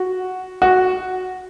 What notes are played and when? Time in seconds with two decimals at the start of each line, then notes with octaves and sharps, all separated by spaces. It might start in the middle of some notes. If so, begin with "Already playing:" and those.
Already playing: F#4
0.62 F#4